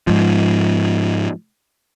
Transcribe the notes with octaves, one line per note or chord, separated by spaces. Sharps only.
G#2 F3